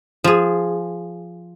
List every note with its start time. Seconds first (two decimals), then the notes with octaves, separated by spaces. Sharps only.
0.24 F3 G#4